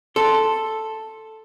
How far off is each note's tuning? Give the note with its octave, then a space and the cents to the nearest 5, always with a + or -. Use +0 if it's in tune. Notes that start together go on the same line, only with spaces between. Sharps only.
A4 +0 C6 +0